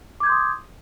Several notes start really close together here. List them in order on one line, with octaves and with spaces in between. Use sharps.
D6 G#6 G6 C6 D#6